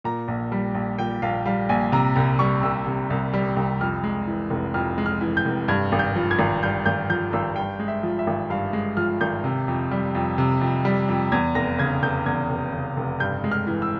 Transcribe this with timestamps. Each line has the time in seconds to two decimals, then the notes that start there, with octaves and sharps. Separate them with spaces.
0.04 A#2 A#5
0.28 A#1
0.52 G3
0.75 A#1
0.98 A#2 G5
1.22 A#1 F5
1.46 G3 F5
1.69 A#1 G#5
1.92 C3 A#5
2.16 C2 A#5
2.39 G3 C#6
2.63 C2 E6
2.87 C3
3.10 C2
3.33 G3
3.56 C2
3.81 F2 F6
4.04 G#3
4.27 E3
4.50 F1
4.74 F2 F6
4.98 G#3
5.06 F6
5.21 E3
5.37 G6
5.45 F1
5.68 G2 G#6
5.92 G#1
5.99 G6
6.16 F3
6.31 G#6
6.39 G#1
6.63 G2 G6
6.86 G#1 G6
7.09 F3 G6
7.33 G#1 E6
7.56 G2 G5
7.79 G#3
7.88 E5
8.03 F3
8.19 E5
8.27 G#1
8.50 G2 F5
8.73 G#3
8.97 F3 F6
9.21 G#1 G6
9.44 C3
9.68 F2
9.91 G3
10.15 F2
10.38 C3
10.61 F2
10.85 G3
11.09 F2
11.32 E2 G#6
11.55 F1 A#6
11.79 C#3 G#6
12.02 F1 G6
12.26 E2 G#6
12.50 F1
12.73 C#3
12.97 F1
13.20 G2 G6
13.44 G#3
13.52 F6
13.67 E3
13.82 E6